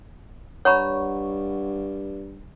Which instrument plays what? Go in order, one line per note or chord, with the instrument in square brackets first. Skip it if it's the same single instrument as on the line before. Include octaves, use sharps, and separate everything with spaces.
[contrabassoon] G2 [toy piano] C#5 A#5 B5 [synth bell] F#5 C#6